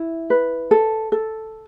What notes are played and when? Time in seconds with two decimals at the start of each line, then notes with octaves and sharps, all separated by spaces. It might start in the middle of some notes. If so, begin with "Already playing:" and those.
Already playing: E4
0.30 B4
0.71 A4
1.12 A4